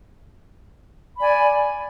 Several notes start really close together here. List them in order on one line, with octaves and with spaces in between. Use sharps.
B5 D5 G#5